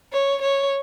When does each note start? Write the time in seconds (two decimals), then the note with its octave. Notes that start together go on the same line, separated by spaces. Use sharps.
0.12 C#5
0.41 C#5